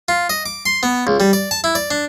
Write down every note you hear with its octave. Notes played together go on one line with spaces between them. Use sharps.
F4
D#5
D6
C6
B3
C#2
G3
D5
A5
E4
D5
D4